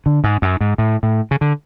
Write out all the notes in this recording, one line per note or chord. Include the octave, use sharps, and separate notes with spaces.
D3
G#2
F#2
G#2
A2
A2
C#3
D3